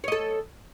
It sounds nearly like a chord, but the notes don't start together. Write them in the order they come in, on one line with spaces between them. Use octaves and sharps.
C#5 D#5 A4